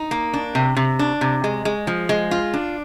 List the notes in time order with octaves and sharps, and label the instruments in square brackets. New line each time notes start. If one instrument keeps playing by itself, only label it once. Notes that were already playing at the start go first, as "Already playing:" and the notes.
Already playing: [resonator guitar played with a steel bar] D#4
A#3
D4
C3
C3
D4
C3
G#3
G#3
F3
G#3
F4
D4